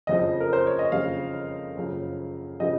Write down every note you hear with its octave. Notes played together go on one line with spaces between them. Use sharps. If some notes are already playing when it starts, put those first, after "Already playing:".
F#1 F2 C#3 F3 D#5
A#4
C5
C#5
D#5
F#1 F2 C#3 F3 F5
F#1 F#2 C#3 F3
C#3 F3 D#5